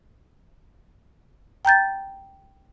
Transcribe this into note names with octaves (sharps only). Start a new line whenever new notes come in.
G5 A#5 G6 A6